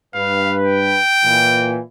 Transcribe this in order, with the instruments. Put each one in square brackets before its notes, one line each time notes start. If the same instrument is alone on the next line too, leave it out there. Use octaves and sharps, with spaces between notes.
[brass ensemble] G2 B4 [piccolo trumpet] F5
[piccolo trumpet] G5
[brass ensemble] A#2 E3